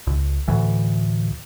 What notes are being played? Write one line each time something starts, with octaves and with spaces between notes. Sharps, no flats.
C#2
D2 A2 E3